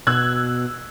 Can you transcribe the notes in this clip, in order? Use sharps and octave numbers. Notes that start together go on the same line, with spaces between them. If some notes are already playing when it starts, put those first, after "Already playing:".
B2 E6 F#6 G#6